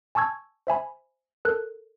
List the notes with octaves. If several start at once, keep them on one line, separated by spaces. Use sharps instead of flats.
G#5 A5 C#6 E6 G#6
C5 E5 G#5 B5
A4 A#4 F#6